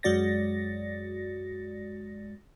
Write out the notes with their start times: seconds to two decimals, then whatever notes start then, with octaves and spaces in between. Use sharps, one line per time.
0.03 F#2 G#3 F#4 D5 A6 A#6